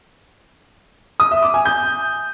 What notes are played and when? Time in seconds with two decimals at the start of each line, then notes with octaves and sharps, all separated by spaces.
1.20 D#6
1.31 E5
1.42 D6
1.54 G#5
1.65 G6